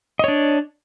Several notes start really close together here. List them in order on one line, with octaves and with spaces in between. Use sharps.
D#5 C#5 D4